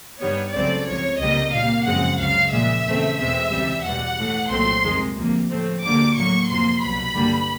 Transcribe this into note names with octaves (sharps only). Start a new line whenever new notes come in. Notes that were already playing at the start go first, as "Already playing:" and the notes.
G2 D#3 G3 B3 C#5
C#2 C#3 F#3 A3 C4 D5
C#2 C3 F3 C#5
C#2 C3 D#3 G3 A#3 D#5
A#2 G3 A#3 F5
F#2 C#3 F3 G#3 C4 F#5
C#2 C#3 F#3 F5
A#2 F3 G#3 E5
E2 C#3 E3 A3 C4
E2 B2 G#3 C4 E5
C#2 C3 E3 G3
E2 B2 G3 F#5
A2 E3 A3
C2 A#2 F#3 A3 C4 C6
F2 C3 D#3 G#3
D2 C3 F3 A#3
A2 F3 A3 C4
D2 D3 G3 A#3 D6
A2 F#3 A#3 C#6
F2 C3 F3 A#3 C6
C2 B2 F#3 B5
G2 D3 G3 A#3